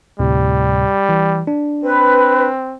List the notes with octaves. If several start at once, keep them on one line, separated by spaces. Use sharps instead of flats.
D2 A2 C3 G3
E3
D4
C4 B4